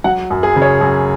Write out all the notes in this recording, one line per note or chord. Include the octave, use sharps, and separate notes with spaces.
F#3 F#5
F#2
G#4
C#3
C#5
F#2